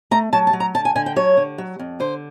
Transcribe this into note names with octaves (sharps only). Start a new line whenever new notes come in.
A3 A#5
F#3 A5
A5
F#3
A#5
D3 A5
G#5
D3 G#5
G5
F#3 C#5
D3
F#3
F2
D3 C5